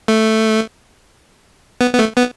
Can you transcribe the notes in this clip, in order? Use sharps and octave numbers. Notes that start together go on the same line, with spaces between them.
A3
B3
B3
A3
B3